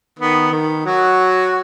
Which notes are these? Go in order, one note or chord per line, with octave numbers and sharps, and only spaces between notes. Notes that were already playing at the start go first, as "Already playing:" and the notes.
D#3 B3
D#3
F#3 F#4